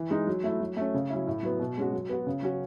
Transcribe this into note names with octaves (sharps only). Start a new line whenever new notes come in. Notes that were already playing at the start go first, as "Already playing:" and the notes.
Already playing: E3
G#3 D#4
F#3
A3 E4
F#3
A3 C#4
C#3
F#3 C#4 E4
A2
F#3 B3
B2
G#3 C#4 F#4
F#3
B3 F#4
C#3
F#3 C#4 F#4